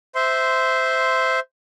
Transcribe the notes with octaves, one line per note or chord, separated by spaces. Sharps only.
C5 E5 C6